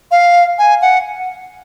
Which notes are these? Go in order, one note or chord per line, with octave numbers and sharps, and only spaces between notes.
F5
G#5
F#5